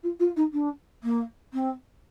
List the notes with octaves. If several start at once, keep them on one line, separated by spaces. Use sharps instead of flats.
F4
F4
D#4
D4
A#3
C4